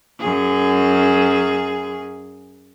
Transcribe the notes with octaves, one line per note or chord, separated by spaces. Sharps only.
F#2 G#4